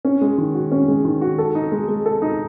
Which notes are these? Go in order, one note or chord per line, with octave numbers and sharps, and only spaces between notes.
C#4
G#3
D#3
F#4
C#4
G#3
D#3
F#4
A4
D#4
G#3
G#3
A4
D#4